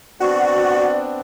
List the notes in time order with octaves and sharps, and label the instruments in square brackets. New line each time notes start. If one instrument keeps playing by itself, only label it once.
[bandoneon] B3 C4 D4 [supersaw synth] F#4 [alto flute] D5